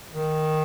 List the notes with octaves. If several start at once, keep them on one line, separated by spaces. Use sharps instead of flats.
D#3